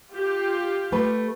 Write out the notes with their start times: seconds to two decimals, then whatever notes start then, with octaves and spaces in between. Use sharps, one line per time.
0.15 F4 G4
0.92 A3 B4